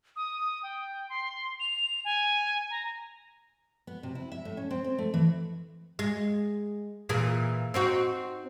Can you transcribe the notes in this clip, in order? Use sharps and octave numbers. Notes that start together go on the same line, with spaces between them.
D#6
G5
C6
F7
G#5
A#5
B3
C3
E4
E5
A2
C#4
C4
C4
A3
E3
G#3
A#2 E3 G#4
C4 D#4 F#4